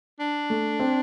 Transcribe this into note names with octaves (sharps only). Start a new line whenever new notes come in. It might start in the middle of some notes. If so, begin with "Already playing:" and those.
D4
A3
C4